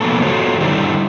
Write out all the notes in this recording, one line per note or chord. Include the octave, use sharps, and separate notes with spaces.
C3 F3 F#3 A#3 B3 A4
D#3 F4 F#4 A4 C5 C#5
D3 G3 D#4 E4 G4 C5